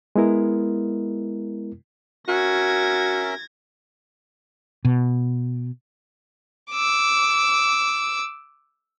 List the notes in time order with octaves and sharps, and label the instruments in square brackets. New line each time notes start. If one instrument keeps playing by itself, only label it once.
[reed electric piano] G#3 B3 E4 A#4
[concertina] C#4 A#4 E5 [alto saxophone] F#4 [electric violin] G#6 A#6
[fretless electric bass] B2
[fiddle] D6 E6